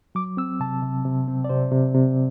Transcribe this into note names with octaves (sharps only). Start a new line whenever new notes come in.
F#3 D6
C4 E6
C3 A5
C3
C3
C4
D5
C3 C5
C3
C3